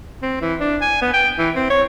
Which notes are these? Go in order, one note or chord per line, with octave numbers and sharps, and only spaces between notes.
C4
E3
D4
G#5
B3
G5
E3
C4
C#5